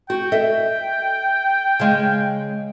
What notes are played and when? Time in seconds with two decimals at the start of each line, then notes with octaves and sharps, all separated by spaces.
0.10 F#4 G5
0.32 A4 D#5 E5
1.79 C#3 G#3